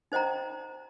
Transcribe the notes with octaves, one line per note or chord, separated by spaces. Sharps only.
D#4 C5 D#5 G5 A#5